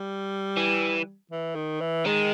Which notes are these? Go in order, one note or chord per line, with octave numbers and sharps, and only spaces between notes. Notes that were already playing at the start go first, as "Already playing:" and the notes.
Already playing: G3
E3
E3
D#3
E3
D#3 G#3